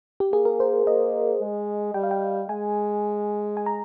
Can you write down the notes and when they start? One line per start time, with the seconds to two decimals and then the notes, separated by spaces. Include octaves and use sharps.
0.20 G4
0.32 A#3 G#4
0.45 A#4
0.60 C5
0.86 A#3 D#5
1.41 G#3
1.94 G3 G5
2.03 F5
2.11 G5
2.49 G#3 G#5
3.57 G#5
3.66 A#5